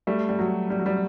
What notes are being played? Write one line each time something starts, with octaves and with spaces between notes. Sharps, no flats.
G3 A3
G3
F#3
G3
F#3
G3